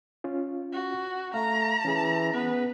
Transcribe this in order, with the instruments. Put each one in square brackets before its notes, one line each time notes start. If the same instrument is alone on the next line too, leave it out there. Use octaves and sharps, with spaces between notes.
[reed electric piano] C#4 F4
[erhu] F#4
[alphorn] A3 [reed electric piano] F5 [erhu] A#5
[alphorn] E3 [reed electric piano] C#4 G#4
[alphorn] B3 [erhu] B4